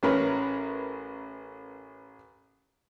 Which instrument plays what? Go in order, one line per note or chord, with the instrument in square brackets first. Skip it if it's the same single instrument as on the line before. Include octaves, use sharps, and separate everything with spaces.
[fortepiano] A1 C#4 A#4 B4